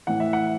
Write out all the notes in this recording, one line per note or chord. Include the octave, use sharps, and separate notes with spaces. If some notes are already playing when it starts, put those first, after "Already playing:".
A2 E3 F#5
E5
F#5